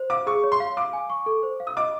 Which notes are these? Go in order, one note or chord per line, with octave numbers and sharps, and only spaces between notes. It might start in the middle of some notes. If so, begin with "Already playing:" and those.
Already playing: C5
F5 D6
G#4 C#6
C#5
C6
F5
F5 D6
G#5
C#6
A4
C5
F5
D#6
D#5 D6